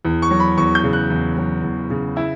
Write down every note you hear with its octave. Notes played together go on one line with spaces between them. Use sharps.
E2
C#6
F#3
B5
E2 C#6
G6
C#3
F#6
E2
F#3
E2
C#3
E4 E6